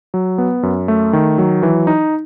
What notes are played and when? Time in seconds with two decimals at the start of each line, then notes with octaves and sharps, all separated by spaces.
0.14 F#3
0.38 B3
0.63 F#2
0.88 A3
1.13 D#3
1.38 F#3
1.63 E3
1.87 D#4